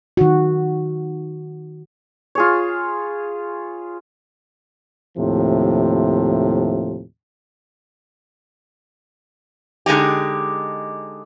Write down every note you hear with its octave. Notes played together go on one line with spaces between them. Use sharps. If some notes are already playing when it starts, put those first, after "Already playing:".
D#3 F#4
F4 G#4 C#5
D#2 A2 C3 F3
D3 G#3 D#4 G4